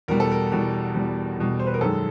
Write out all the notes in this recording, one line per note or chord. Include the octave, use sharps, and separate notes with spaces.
E2 B2 G3 A#4
A4
A#4
E2 B2 G3
E2 B2 G3
E2 B2 G3
C5
B4
A#4
F#2 D#3 G#3 A4